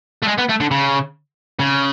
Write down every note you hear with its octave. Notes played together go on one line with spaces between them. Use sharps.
A3
G#3
B3
A3
D3
C#3
C#3